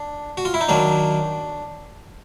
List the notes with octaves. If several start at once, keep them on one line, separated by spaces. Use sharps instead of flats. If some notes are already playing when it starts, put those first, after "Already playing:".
Already playing: D4
F#4
F4
E4
D#4
D#3 F#3 A#3 D4